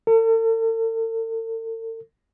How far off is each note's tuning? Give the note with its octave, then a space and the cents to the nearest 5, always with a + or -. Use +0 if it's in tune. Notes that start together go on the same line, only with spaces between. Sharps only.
A4 +45